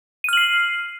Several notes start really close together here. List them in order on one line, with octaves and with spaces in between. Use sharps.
D#7 F6 F#7 C7